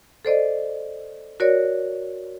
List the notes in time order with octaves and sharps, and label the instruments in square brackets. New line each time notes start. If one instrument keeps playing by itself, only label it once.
[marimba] A4 C5 D5 D#5
F#4 A#4 C#5 D5